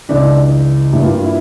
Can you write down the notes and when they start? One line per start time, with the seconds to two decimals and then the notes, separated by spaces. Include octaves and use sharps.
0.09 C#2 C#3 E3 D4
0.92 G2 E3 G3 A#3 E4
1.03 F4
1.13 F4
1.24 E4